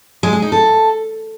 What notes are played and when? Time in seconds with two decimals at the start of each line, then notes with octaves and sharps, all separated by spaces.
0.23 G#3
0.33 G#4
0.42 D#4
0.52 A4